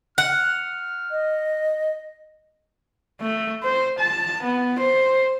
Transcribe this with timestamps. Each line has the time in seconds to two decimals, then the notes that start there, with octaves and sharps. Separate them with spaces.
0.18 F#5 F6
1.11 D#5
3.21 A3
3.63 C5
3.99 A5
4.43 B3
4.79 C5